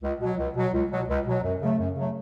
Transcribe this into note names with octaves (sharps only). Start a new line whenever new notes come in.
C#2
B2 F#3
C#2
B2 F#3
C#2
B2 F#3
C#2
B2 F#3
F#2
C#3 F#3 A3
F#2
C#3 F#3 A3